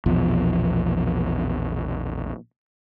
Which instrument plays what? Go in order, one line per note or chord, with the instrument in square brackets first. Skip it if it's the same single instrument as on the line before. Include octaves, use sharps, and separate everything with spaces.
[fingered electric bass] A#1 E2 B2 F3